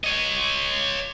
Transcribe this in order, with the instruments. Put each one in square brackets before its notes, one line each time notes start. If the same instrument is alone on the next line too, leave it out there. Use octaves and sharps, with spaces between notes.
[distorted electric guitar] C#5 D#5